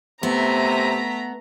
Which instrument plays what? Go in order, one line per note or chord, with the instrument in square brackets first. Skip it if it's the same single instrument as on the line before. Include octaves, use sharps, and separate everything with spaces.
[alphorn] C3 [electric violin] A3 B6 [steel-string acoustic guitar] B3 [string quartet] A#5